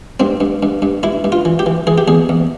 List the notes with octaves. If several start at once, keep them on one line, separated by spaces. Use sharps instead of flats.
G2 C4
G2
G2
G2
G2 E4
G2
F4
E3
G4
E3
E3 G#4
G4
E2 G#4
E2